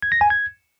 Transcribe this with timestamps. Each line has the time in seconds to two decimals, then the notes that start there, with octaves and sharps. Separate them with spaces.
0.02 G#6
0.12 A#6
0.21 G#5
0.30 G#6